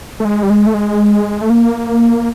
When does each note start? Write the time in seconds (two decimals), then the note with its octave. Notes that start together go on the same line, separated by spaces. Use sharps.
0.20 A3
0.25 G#3
0.43 G3
0.50 G#3
0.67 A3
0.74 G#3
1.41 A3
1.50 A#3